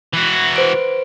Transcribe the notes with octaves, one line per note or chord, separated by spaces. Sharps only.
E3 F#4
B4 C5 D7